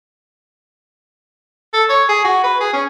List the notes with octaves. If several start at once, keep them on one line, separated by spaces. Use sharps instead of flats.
A4
C#5
G#4
F#4
B4
G#4
C#4